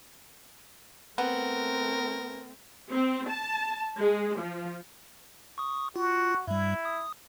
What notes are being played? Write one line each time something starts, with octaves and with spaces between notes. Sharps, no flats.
A3 B3 C4 A#4
C4
A5
G#3
F3
C#6 D#6
F4 F#4
G2 G3 E4
D#6